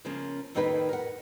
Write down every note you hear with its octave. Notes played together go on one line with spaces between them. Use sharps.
C#3 F3 A#3 C#4
F2 A2 D#3 A#3 D#4 B4
A#4 F#5